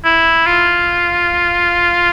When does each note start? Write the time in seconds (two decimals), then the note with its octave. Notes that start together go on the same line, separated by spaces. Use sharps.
0.04 E4
0.46 F4